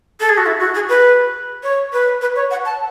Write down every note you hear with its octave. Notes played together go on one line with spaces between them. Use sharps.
A4
G#4
F#4
E4
F#4
G#4
B4
C#5
B4
B4
C#5
F#5
A5